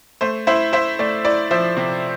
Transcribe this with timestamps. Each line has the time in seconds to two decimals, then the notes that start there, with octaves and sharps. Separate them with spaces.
0.21 A3 C5
0.47 E4 C5 E5
0.73 E4 C5 E5
0.99 A3 D5
1.25 E4 D5
1.51 F3 C5 E5
1.77 C3